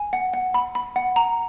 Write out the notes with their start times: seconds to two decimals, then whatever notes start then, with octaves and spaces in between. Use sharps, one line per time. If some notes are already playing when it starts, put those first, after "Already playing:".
Already playing: G#5
0.13 F#5
0.34 F#5
0.54 B5
0.75 B5
0.96 F#5
1.16 A#5